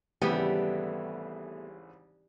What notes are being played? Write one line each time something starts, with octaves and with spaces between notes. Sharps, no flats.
G#1 C#3 E3 G3 A3 B3 G4